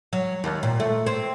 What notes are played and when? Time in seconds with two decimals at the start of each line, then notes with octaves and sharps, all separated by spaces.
0.13 F#3
0.44 D#2
0.63 A#2
0.80 A3
1.06 C4